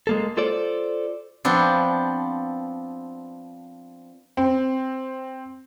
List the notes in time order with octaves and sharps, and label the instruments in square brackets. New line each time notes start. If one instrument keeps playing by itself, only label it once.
[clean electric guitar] G#3 A#3 A4
F4 A4 C5 D5
[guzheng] F3 B3 C4 D4
[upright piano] C4